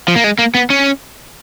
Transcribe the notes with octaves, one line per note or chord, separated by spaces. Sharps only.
F3
A#3
G#3
A#3
B3
C#4